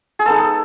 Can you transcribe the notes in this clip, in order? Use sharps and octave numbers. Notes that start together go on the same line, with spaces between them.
G#4
G#3 B3 D#4 A4